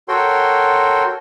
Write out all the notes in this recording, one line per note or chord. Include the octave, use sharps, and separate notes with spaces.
F#4 A4 A#4 C#5 G5 C6